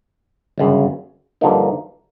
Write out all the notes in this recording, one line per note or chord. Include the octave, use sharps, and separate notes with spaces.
G1 F#2 C#3
G2 D3 F3 A#3 D#4